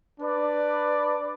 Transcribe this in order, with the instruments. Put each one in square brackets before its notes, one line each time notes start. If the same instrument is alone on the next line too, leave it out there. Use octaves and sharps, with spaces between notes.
[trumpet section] D4 B4 D5